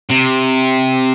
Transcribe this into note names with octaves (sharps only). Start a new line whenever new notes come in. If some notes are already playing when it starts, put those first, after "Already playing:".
C3